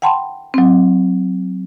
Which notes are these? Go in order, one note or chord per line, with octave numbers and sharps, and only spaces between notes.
F#5 G5 A5 B5 C6
F#3 C4